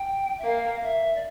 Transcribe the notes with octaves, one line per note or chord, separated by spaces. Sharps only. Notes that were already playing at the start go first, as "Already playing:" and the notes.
Already playing: G5
E5
A#3 F5
E5
D5